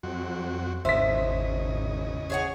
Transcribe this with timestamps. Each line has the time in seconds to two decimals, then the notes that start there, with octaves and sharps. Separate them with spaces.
0.03 F2 F#3 C4 F#4
0.85 G#1 E2 C#3 C5 D#5 E5 B6
2.30 G#4 C#5 F#5